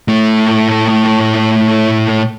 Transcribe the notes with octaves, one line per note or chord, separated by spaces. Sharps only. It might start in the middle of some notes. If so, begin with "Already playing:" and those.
A2 A3